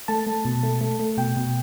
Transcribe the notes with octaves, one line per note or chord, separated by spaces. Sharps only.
A3 A5
A3
B2
A3
A3
A3
B2 G5
B2